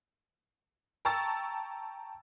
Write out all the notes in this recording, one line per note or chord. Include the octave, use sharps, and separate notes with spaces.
G5 A5 A#5 C#6 E6 A6